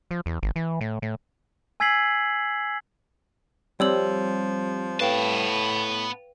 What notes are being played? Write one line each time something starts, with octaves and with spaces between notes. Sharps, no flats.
F3
E2
G#1
E3
A2
A2
G#5 E6 G#6 B6 C7 F#7
F3 G3 C4 C#5 E6 F#7
A2 B3 B4 F5 G5 A5